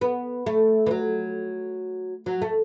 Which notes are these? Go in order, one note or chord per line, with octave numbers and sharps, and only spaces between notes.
B3
A3
E3
F#3
F#3
A3